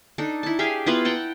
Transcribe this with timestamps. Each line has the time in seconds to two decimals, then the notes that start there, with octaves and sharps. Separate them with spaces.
0.18 D4 D#4 A4
0.43 E4 A5
0.59 G4 G#4 E5 F5
0.86 B3 E4 F4 B4
1.05 F#5 G5 A5 A#5